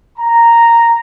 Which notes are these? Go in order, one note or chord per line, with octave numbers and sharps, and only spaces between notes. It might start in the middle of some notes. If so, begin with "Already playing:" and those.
A#5